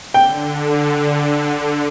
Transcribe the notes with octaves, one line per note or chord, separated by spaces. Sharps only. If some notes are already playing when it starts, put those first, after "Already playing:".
D3 G5